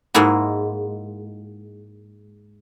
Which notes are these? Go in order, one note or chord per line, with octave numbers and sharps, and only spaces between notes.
G#2 G#3 A#3 E4 F#4